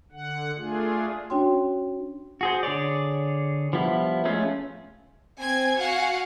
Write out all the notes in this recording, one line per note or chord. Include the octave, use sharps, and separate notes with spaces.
D3 F#5
A3 D4 F4 G#4
C#4 D4 F#4 C#5 G5 C6
F#4 G#4 C5
D3 G#4 C#5 D5
F3 G3 B3 E4
G#3 A3 C#4 F4
C4 G#5 G#6
F#4 F5 F#5 G#5